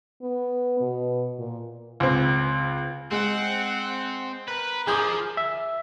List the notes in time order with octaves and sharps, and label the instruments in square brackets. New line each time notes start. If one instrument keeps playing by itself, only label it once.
[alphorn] B3
B2
A#2
[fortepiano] C#2 C4
[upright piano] G#3 [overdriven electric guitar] C4 [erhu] F#5
[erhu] A#4 [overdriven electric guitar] B4
[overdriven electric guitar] F3 [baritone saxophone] G#4 [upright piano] D6 D#6 G6
[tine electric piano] E5